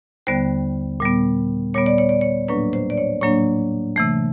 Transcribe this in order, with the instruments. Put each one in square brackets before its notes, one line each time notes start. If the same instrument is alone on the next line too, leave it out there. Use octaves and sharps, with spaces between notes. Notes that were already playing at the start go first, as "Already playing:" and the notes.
[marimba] D#2 D3 G3 B3 C5
A#2 G3 B3
A#2 G3 B3 C#5
D5
C#5
D5
C#5
A2 F#3 A#3 D4 B4
C5
D5
C#5
A2 F#3 A#3 D4 C#5
C3 E3 A3